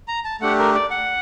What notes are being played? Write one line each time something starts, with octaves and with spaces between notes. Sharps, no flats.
A#5
A5
A3 D4 G4 F#5
A#4
D5
F#5